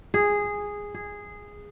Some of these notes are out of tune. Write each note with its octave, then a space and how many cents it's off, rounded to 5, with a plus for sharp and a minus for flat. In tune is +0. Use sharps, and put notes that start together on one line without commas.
G#4 -10
G#4 -10